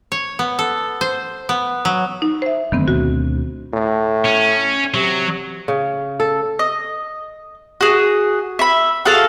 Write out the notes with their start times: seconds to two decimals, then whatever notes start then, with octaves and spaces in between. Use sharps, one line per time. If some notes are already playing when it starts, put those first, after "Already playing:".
0.12 C#5
0.39 B3
0.59 A4
1.01 C5
1.49 B3
1.85 F#3
2.22 D#4
2.42 C5 E5
2.72 F#2 D3 D#3 A3 B3 C4
2.88 D2 B2 D3 F#4
3.73 A2
4.26 C#4
4.94 C3 F#3
5.68 C#3
6.20 A4
6.59 D#5
7.81 F#4 G#4
8.59 E5 B5
9.05 F#4 G#4 A4 F5